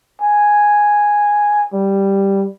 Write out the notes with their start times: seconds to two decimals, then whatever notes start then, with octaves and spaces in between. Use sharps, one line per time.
0.21 G#5
1.73 G3